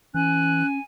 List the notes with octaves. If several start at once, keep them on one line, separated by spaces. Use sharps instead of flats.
E3 C#4 G#5 F#6